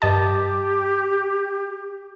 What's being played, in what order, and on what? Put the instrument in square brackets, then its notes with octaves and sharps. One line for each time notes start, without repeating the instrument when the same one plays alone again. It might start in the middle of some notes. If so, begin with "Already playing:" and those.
[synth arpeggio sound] G2 D#5 A5 [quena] G4